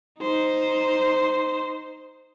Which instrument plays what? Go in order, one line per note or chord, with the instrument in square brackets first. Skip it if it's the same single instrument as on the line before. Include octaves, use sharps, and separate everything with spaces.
[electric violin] D#4 C5